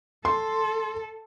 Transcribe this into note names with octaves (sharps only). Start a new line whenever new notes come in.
A4 C6